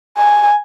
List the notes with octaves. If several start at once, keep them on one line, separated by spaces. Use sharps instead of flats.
G#5